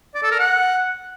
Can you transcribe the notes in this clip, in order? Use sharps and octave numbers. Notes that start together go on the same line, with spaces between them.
D5
A4
A#4
F#5